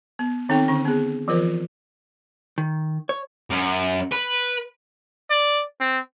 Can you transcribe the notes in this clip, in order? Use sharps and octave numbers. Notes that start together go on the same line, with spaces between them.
B3
D#3 C4 D#4 A4 G5
D3 C#4
B3 G#4
E3 F3 F4 A#4 C5
D#3
C#5
F#2
B4
D5
C4